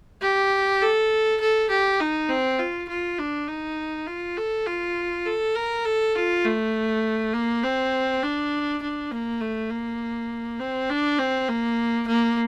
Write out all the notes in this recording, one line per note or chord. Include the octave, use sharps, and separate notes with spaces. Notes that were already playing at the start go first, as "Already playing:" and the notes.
G4
A4
A4
G4
D#4
C4
F4
F4
D4
D#4
F4
A4
F4
A4
A#4
A4
F4
A3
A#3
C4
D4
D4
A#3
A3
A#3
C4
D4
C4
A#3
A#3